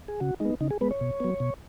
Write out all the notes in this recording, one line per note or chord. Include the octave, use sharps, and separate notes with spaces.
G#4
C#3 F#4
G#3 B3 D#4
C#3 D#4
G#4
G#3 B3 B4
C#5
B2
F#3 B3
B2